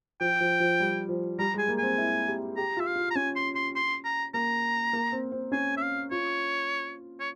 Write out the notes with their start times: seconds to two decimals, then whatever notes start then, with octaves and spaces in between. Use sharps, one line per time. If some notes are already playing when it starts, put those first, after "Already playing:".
0.21 F3 G5
0.41 F3
0.60 F3
0.80 G3
1.09 F3
1.39 G3 A#5
1.54 G#3
1.58 G#5
1.69 A#3
1.78 C4 G#5
1.98 E4
2.28 G4
2.57 G4 A#5
2.77 F4
2.80 E5
2.87 F5
2.96 F4
3.11 A#5
3.15 C#4 G#5
3.36 C6
3.55 C6
3.75 C6
4.05 A#5
4.34 A#3 A#5
4.93 A#3
5.12 C4
5.32 C4
5.52 C#4 G#5
5.77 E5
5.82 F5
6.11 F4 C#5
7.20 C#5